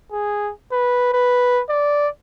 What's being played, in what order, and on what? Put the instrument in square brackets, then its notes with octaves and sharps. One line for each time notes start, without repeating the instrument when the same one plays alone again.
[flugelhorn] G#4
B4
B4
D5